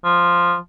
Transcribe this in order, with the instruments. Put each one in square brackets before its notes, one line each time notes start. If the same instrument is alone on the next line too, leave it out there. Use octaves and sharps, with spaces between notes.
[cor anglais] F3